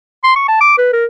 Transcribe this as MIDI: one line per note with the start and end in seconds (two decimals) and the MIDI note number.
0.24 0.34 84
0.36 0.45 85
0.48 0.60 81
0.61 0.74 86
0.78 0.90 71
0.93 1.05 70